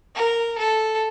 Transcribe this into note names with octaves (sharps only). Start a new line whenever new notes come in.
A#4
A4